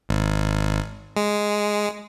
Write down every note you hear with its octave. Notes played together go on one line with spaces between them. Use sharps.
G#1
G#3